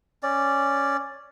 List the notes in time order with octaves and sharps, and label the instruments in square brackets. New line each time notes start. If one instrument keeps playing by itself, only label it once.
[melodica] C#4 D5